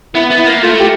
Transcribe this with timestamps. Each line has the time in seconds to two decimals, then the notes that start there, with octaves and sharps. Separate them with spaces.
0.15 B3 E4
0.31 B3
0.38 E4
0.47 A#3
0.63 A3 F4
0.80 G4